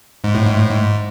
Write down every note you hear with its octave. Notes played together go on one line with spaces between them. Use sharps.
G#2
A2
G#2
A2
G#2